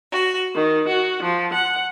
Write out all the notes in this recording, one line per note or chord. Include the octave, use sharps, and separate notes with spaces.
F#4
D#3
F#4
F3
F#5